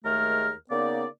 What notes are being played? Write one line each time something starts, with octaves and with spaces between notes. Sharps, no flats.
D#2 G#3 A3 G#4 A#4 F6
C#3 A#3 B3 D#4 D5